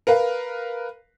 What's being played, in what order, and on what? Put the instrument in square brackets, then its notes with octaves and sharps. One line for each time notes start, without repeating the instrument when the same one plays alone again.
[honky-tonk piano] A#4 B4 F5